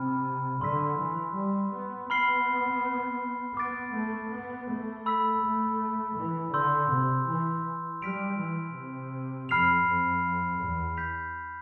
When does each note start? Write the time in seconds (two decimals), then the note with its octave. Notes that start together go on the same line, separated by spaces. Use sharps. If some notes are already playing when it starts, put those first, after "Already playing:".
Already playing: C3 B5 F6
0.61 D3 C6 E6 B6
0.99 E3
1.35 G3
1.72 B3
2.10 B3 B5 F6 C7 G7
3.57 B3 D6 A6 D7
3.94 A3
4.32 B3
4.69 A3
5.06 B5 E6 B6
5.42 A3
6.17 E3
6.53 D3 C6 E6 G6
6.91 C3
7.27 E3
8.02 G3 F6 B6 D7 F7
8.38 E3
8.75 C3
9.49 F2 B5 F6 C7 F7
9.86 F2
10.60 E2
10.97 G6 B6 F7